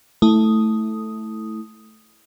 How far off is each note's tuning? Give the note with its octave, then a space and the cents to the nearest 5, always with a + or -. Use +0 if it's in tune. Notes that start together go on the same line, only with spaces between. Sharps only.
A3 +0 E4 -15 D#6 +0